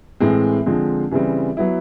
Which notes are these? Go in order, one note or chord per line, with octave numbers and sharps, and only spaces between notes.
A2 E3 G#3 C4
D3 F3 G#3 C4
C#3 E3 G3 C4
F#3 B3 E4